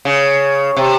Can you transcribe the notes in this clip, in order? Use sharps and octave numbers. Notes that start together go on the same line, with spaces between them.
C#3
C3